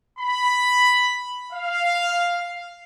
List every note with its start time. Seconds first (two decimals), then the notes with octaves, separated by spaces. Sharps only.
0.20 B5
1.53 F5